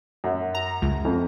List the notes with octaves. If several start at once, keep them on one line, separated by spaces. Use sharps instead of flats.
F#2
A#5
C#2
F2